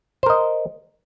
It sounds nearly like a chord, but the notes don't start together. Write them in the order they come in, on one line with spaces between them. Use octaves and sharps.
C5 A#4 D#5